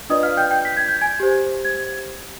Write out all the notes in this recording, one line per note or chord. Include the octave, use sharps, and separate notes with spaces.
D4 F4 B4 D5 D#5 D#6
F5 F6
G5 G6
G5 G6
B6
G#6
G6
G#5 G#6
G4 C5
G#6